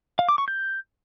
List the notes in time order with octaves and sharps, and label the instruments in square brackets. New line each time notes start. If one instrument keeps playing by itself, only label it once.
[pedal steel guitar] F5
D6
C#6
G6